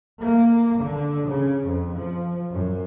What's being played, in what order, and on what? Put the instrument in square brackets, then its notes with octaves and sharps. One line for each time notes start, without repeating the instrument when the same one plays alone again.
[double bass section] A#3
D3
C#3
F2
F3
F#2